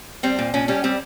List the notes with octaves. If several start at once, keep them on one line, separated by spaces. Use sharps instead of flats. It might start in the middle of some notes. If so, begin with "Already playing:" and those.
G3 C4
A#2
A#2 C#4
G3 C#4
G3 C4